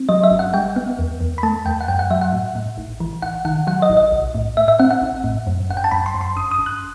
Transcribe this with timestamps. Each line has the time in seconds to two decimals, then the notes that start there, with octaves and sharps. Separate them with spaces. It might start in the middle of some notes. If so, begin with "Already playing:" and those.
Already playing: C4
0.09 F#3 D#5
0.24 E5
0.31 G1
0.39 F#5
0.54 G3 G5
0.76 B3
0.99 E2
1.21 E2
1.38 B5
1.43 A3 A5
1.65 E2 G5
1.81 F#5
1.88 F#2 G5
1.99 F#5
2.10 F#3 E5
2.21 F#5
2.33 A2
2.55 A2
2.78 A1
3.00 E3
3.22 A1 F#5
3.45 D#3 F#5
3.67 F#3 F#5
3.82 D#5
3.90 A1
3.97 D#5
4.12 B1
4.35 A2
4.57 A2 E5
4.68 E5
4.79 C4 F#5
4.91 F#5
5.02 A1
5.24 A2
5.47 F#2
5.70 G1 F#5
5.77 G5
5.84 A5
5.91 F#2 B5
6.06 C6
6.14 F#2
6.21 C6
6.36 G1 D#6
6.51 D#6
6.58 G1
6.66 F#6